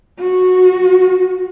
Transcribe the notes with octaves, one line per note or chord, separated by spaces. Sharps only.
F#4